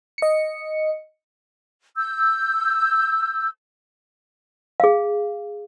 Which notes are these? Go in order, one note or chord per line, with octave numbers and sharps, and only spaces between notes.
D#5 C#7
E6 G6
G#4 F5